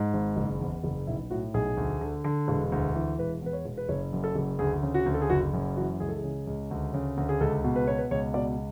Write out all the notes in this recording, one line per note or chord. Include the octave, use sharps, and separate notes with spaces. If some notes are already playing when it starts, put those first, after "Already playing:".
Already playing: G#2
G#1
F#1
E2
F#1
B1 E4
A2 F#4
B1 G#4
D2
D3
D3
E1
D2
E3
E1 B4
E2 B4
C#5
E1
B4
F#1 C#5
F#2
A4
F#1
D2 G#4
C#3
F#4
D2
A4
G#4
F#1 F#4
F#2
E3 F#4
C#2 G#4
A4
G#4
C#3
C#2
D2
C#3
D2
G#4
C#2 A4
B2
B4
B2 C#5
B4
C#2 C#5
B2 D5